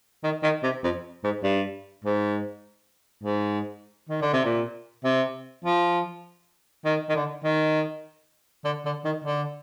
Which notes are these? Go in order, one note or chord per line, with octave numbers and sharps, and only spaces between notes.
D#3
D#3
C3
F2
G#2
G2
G#2
G#2
D#3
D3
C3
A#2
C3
F3
D#3
D#3
D3
D#3
D3
D3
D#3
D3